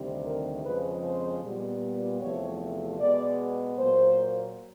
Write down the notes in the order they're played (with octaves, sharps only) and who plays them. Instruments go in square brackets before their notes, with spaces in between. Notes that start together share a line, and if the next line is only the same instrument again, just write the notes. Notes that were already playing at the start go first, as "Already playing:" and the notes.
Already playing: [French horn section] D2 C3 D#3 G3 C4
A#4
F2 C#3 F3 G#3 C4 B4
C5
A#2 G3 B3
E2 C3 F3 A3 C4 C#5
B2 G#3 B3 D5
A#2 F#3 A#3 C5